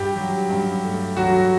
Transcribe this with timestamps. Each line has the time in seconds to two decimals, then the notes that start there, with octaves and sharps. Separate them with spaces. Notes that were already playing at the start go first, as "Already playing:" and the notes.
Already playing: G2 G4
0.16 F#3
0.50 G2
0.84 A3
1.17 F#3 F#4